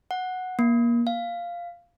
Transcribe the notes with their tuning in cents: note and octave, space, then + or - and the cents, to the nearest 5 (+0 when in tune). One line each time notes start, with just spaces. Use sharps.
F#5 -5
A#3 +25
F5 -5